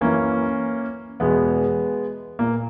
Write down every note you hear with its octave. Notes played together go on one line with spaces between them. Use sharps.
F#2 E3 A#3 C#4
E2 B2 G#3 B3
A#2 A#3